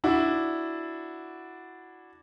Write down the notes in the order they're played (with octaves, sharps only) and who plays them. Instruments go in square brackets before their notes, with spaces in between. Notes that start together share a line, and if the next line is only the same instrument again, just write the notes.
[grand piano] D4 E4 F#4